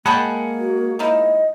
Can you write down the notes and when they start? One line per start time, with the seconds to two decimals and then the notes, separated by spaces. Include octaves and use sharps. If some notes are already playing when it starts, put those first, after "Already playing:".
0.06 G#3 A#3 G#4 F#5 G5 A5 B5
0.58 F#4
0.99 F3 D#4 E4 D#5